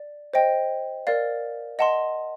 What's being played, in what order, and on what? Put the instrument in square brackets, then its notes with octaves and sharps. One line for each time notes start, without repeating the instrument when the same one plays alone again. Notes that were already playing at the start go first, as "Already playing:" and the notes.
Already playing: [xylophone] D5
C5 D#5 G5
A#4 D5 F5
D#5 F#5 A5 C6